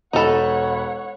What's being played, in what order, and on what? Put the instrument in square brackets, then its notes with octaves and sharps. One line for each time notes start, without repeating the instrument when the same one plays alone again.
[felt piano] E1 B5 [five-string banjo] D#4 A4 [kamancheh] C#5 F#5